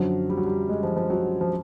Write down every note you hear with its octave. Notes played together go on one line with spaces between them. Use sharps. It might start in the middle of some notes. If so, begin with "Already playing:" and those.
Already playing: F#2 D3 F3 F#3
G3
F#3
G3
G#3
F3
F3
F#3
F3